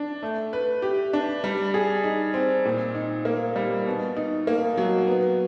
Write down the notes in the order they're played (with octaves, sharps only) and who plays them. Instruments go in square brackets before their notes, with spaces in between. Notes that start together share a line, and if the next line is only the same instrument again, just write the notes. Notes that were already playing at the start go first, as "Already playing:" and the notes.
Already playing: [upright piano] D4
A3
B4
G4
D4
G3
G#4
D#4
C4
A#2
D#4
A#3
G3
B2
D#4
A#3
F#3
B3